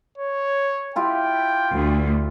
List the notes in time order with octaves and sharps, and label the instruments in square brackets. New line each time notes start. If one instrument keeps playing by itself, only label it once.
[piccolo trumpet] C#5
[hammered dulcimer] E4 F4 G4 [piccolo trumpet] G5
[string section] D2